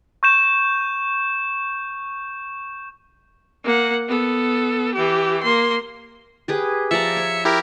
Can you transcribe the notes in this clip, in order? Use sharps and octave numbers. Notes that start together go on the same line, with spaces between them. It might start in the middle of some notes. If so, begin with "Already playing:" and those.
C#6 G6 E7
A#3 F#5
B3 A4
E3 G4
A#3 C6
G4 G#4 B4
F3 D5 E5 A#5 C#7
C#5
E4 G4 A#4